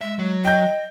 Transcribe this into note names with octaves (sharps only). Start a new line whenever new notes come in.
G#3 E5
F#3
D#5 G5 G6